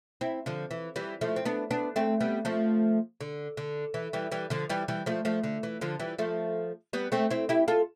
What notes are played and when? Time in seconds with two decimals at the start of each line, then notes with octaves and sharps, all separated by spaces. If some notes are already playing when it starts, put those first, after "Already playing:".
0.21 C4 E4
0.46 D3 F3
0.71 E3
0.96 E3 G3
1.21 F3 A3
1.36 C4
1.45 B3 D4
1.71 B3 D4
1.96 A3 C4
2.20 G3 B3
2.45 F3 A3
3.21 D3
3.57 D3
3.94 E3
4.13 E3 G3
4.32 E3 G3
4.50 D3 F3
4.70 E3 G3
4.88 E3 G3
5.06 F3 A3
5.25 F3 A3
5.44 D3
5.63 E3
5.81 D3 F3
6.00 E3 G3
6.18 F3 A3
6.93 G3 B3
7.12 A3 C4
7.30 C4 E4
7.49 E4 G4
7.68 F4 A4